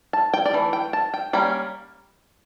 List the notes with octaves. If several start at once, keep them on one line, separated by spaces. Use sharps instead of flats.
A5
G5
D5
E3 A3
G5
A5
G5
G3 A#3 C#4 G5